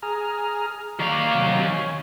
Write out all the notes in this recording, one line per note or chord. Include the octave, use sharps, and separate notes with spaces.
G#4 A#5 F6
D#3 D5 F5 A#5 C#6
C3 F#3
C#5 G#5